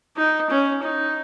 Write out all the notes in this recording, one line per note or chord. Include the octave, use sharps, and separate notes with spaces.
D#4
C#4
D#4